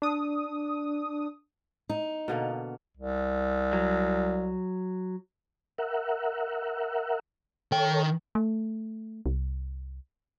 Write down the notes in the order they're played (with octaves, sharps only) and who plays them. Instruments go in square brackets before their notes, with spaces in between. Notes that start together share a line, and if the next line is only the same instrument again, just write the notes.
[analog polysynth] D4 D#6
[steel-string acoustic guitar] D#4
[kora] B2 D3 A#3
[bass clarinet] C2
[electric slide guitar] F#3
[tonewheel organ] A#4 E5 F#5
[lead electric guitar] D#3 G5 [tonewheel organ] A4 C#5
[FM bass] A3
C2